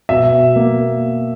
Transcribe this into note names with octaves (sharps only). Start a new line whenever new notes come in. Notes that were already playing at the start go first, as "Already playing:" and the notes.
B2 E5
A#3